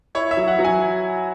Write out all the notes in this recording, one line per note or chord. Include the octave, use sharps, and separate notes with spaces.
E4 C#5
E5
F#3
F#5
F#3
G#5